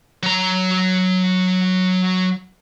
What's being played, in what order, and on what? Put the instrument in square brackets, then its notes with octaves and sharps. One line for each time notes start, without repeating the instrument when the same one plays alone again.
[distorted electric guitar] F#3 A#5